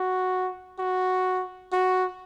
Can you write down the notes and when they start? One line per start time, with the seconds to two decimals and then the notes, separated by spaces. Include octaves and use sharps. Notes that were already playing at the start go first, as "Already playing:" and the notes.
Already playing: F#4
0.79 F#4
1.73 F#4